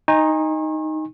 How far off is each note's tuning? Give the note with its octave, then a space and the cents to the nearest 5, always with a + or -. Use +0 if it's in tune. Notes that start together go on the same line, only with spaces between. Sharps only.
D#4 +0 G#5 -30 C#6 -40